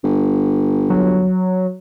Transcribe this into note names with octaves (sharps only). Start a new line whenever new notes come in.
G1
F#3